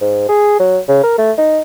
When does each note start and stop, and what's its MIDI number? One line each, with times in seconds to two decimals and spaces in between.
0.01 0.24 44
0.29 0.59 68
0.60 0.79 54
0.88 1.01 49
1.03 1.15 70
1.18 1.32 57
1.38 1.62 63